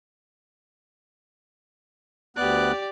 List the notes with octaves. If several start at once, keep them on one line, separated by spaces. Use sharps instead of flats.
D2 B3 G4 D5 F#6